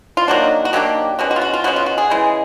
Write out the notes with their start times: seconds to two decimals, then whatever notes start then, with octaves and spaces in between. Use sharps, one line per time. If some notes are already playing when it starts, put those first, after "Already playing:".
0.17 F4
0.28 D#3 F#3 A#3 D4 F#4
0.65 F#4
0.73 D#3 F#3 A#3 D4 G4
1.19 B2 G#3 C#4 F#4
1.31 F#4
1.36 F4
1.41 F#4
1.53 F4
1.64 B2 G#3 C#4 F#4
1.76 F4
1.86 F#4
1.98 G#4
2.10 C#3 E3 G#3